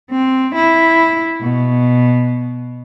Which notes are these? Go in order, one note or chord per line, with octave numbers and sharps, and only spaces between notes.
C4
E4
B2